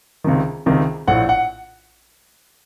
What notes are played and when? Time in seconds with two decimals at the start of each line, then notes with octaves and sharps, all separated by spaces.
0.24 C#2 C3 D#3
0.66 C#2 C3 D#3
1.08 A#1 A2 F#5
1.29 F#5